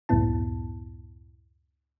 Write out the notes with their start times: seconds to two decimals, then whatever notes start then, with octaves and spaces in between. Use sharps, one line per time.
0.09 C#2 F#2 A2 B3 E4 A5